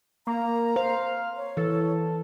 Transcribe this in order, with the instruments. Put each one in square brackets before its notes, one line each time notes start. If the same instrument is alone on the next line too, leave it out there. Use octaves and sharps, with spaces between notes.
[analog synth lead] A#3 [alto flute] A#5
[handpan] C5 [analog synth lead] F5
[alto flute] C#5
[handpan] E3 [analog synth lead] A4